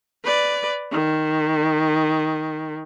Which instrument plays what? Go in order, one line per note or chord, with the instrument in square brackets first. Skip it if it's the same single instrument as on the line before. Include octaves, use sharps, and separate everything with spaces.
[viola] B4 D5
D#3